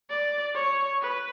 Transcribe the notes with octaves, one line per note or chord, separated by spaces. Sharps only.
D5
C#5
B4